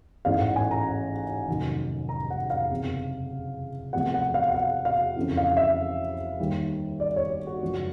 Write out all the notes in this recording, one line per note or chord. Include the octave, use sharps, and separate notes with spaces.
A1 G#2 E3 F5
F#5
G#5
A#5
F1 D#2 D#3 F#3
A#5
F#5
F5
F#1 E2 C3
E2 C3 F3 A3 F#5
F#5
F5
F#5
F5
F5
F2 C#3 E3
F5
E5
D#2 D#3 G3
D5
C#5
F#4
F#1 F#2 C#3 F3 G#3